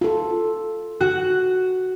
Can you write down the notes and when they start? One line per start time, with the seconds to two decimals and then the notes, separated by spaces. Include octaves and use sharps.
0.01 F4 A4
1.01 F#4 F#6